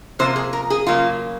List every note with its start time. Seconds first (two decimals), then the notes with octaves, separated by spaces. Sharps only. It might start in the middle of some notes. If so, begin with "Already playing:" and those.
0.19 C3 F3 A#3 C5
0.36 G#4
0.53 A#4
0.70 G#4
0.87 C#3 F#3 A#3 F4